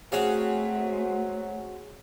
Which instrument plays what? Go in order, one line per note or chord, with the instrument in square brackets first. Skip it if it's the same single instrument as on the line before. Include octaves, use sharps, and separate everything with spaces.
[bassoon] F#3 [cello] A3 [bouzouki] C4 F#4 [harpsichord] C#4 G#4 F5